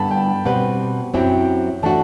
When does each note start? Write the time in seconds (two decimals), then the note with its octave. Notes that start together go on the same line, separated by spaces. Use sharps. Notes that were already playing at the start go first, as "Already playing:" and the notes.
Already playing: G2 D3 G3 B3 A5 B5
0.11 G5
0.45 B2 G3 C4 G4 B4 F#5
1.14 F#2 F#3 C4 E4 G4 G5
1.83 E3 A3 D4 F#4 A5